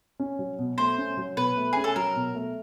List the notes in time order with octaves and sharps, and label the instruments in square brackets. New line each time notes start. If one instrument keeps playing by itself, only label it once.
[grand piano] C#4
F#3
B2
[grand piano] A3 [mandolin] C5
[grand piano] C#4
F#3
[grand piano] B2 [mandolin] B4
[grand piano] A3
[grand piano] C#4 [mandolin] G#4
[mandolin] A4
[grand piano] F#3 [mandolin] A#4
[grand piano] B2
A3